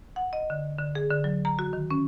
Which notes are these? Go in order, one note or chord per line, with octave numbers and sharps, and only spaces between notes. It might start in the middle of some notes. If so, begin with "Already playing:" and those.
F#5
D#5
D3
D3
G#4
D3
F#3
A#5
F#4
D#3
C#4